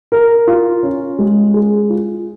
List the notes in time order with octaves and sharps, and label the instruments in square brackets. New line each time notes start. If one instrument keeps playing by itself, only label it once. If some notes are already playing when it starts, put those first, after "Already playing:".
[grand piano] A#4
F4
C#4
G#3
G#4
F4